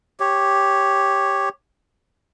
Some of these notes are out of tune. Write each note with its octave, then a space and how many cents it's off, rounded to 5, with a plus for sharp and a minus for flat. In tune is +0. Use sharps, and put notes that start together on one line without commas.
G4 +0 C#5 -5